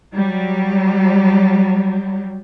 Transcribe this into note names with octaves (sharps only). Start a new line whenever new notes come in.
F#3 G3